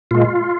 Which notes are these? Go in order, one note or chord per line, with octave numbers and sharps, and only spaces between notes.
A#2 G#3 F4